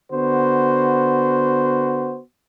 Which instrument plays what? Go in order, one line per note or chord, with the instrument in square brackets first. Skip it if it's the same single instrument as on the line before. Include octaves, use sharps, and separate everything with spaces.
[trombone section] D3 B3 F#4 C5